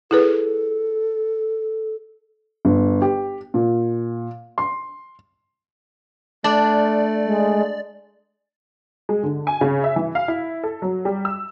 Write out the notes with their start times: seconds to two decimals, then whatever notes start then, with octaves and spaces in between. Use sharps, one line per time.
0.11 E4 G#4 A4 B4
2.65 G1
3.02 G4
3.54 A#2
4.58 C6
6.44 A3 D4 D5
7.25 G#3
9.09 G#3
9.23 D3
9.47 G#5
9.61 C#3
9.84 E5
9.96 E3
10.15 F5
10.28 E4
10.64 A4
10.82 F#3
11.05 G3
11.25 E6